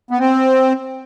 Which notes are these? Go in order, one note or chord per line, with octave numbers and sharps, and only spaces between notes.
B3
C4